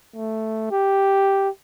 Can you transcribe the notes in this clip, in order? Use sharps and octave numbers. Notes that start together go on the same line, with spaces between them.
A3
G4